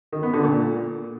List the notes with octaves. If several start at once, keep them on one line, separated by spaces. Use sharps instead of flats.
D#3
B3
D3
A#2